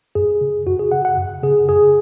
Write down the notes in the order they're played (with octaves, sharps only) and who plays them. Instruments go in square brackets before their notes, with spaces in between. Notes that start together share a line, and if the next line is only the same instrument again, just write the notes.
[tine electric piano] F#2 G#4
C#3
F#2 F#4
G#4
C#3 F#5
F#5
F#2
C#3 G#4
F#2 G#4